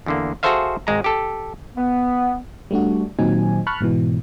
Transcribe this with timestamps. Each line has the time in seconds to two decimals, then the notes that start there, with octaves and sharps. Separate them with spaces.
0.06 E2 D3 A#3
0.43 F#4 G#4 A4 C5 E5 F5
0.87 G#1 G#3 A#5
1.04 G4 A4
1.76 B3
2.71 G3 A3 D4 F#4
3.19 A#2 D#3 F#3 C4 D#4 G#5
3.67 A5 B5 C#6 F6 F#6
3.80 G#2 B2 E3